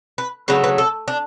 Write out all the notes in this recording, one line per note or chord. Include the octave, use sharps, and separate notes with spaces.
B4
C#3 F#3 A3 B4
B4
A4
D4